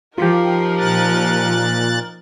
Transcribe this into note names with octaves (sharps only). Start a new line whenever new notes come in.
F3 D#4 F4 G4 A#4
A#2 F#6 A6